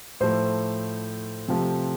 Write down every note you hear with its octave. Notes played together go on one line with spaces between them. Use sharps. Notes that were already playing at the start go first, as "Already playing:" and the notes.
A2 F3 A3 C5
C3 F3 A3